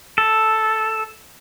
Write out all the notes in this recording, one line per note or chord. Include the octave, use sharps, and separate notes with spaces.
A4